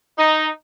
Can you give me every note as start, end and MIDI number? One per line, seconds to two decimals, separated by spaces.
0.17 0.47 63